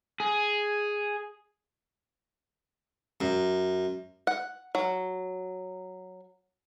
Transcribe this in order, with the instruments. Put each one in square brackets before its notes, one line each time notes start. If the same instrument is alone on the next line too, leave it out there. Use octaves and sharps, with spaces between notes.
[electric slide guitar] G#4
[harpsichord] F#2
[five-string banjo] F#5
F#3